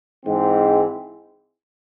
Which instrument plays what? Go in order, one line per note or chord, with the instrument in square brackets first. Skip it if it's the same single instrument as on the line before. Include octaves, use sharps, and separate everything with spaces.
[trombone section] G#2 E3 G#3 C4